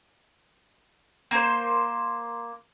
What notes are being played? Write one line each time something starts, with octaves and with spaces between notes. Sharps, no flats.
A#3 C5